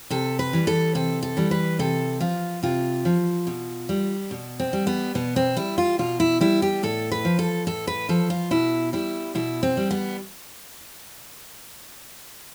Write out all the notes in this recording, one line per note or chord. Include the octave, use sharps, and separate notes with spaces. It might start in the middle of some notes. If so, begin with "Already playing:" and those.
C3 A4
B4
E3 G3
A4
C3 A4
A4
E3 G3
B4
C3 A4
F3 F4
C3 F4
F3
B2
G3
B2
C4
G3
B3
B2 B3
C4
G3 E4
F4
B2 F4
E4
G3 E4
G4
A2 A4
B4
F3
A4
A2 A4
B4
F3 A4
F4
B2 E4
G3 E4
B2 E4
C4
G3
B3